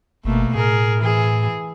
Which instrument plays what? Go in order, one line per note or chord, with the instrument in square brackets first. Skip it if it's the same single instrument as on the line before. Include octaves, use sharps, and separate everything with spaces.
[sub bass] G1 [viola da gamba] B2 A3 A#3
[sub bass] A2 [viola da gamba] G#4 A#4
[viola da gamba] E3 G#4